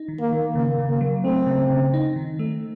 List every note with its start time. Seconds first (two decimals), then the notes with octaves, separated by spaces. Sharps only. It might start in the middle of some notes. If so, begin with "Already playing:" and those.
Already playing: D#4
0.08 D#3
0.20 A#3
0.33 D#3
0.55 C#3 A#3
0.79 C#3
0.89 A#3
1.01 F#3
1.24 A3 C4
1.46 C#3
1.70 C#3
1.94 D#4
2.16 D#3
2.39 A3